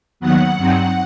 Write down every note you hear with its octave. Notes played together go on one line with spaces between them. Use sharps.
D#2 D#3 F#3 B3 F#5
G2 F#3 C4 D#4